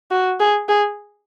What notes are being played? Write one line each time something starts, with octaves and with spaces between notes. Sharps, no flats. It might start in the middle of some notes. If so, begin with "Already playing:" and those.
F#4
G#4
G#4